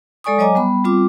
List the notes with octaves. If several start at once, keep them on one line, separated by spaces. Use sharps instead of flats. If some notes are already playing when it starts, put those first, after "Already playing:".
G#3 A4 D5 G#5 C#6 D#6
F#3 C#5 D#5 G#5 A#5 D6
G3 B3 B5
G3 C4 F4 D6